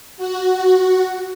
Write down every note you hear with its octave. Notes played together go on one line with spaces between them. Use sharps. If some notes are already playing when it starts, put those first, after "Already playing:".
F#4